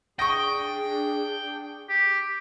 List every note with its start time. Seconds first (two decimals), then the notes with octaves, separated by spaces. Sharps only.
0.19 D4 G#4 G5 C#6 D#6 A#6
1.89 G4